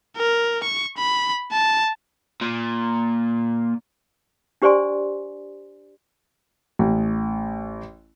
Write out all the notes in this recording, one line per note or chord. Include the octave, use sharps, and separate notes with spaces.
A#4
C#6
B5
A5
A#2
D4 G4 C5 D5 G#5 C6
A1